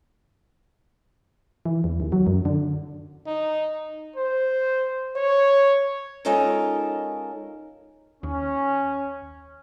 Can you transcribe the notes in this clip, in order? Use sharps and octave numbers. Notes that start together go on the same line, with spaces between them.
E3
E2
D#2
F#3
F#2
D3
D#4
C5
C#5
G#3 C#4 D#4 F4 A4 A#4
D#2 C#4